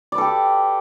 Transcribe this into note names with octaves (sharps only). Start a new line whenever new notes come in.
G4 A4 B4 D5